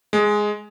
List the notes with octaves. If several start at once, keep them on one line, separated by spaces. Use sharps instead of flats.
G#3